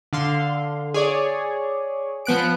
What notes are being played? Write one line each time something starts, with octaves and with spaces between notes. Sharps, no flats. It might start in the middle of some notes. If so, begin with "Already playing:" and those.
D3 F5 C6
G#4 C#5 D5
F3 B3 F#6 D7